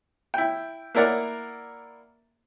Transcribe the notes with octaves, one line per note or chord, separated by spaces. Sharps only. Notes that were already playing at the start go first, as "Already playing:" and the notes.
E4 G5
A#3 E4 A#4 D5 F#5